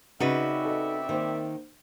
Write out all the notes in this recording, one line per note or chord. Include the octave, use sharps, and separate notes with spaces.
C#3 C4 D#4 F#4 B4 D5 E5
A4 D#5
D#3 A#3 C5